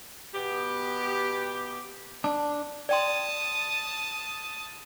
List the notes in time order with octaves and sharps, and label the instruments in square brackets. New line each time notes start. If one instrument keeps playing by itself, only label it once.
[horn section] B2 B3 G4
[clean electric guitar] D4
[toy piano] D5 G5 C6 [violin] A5 D#6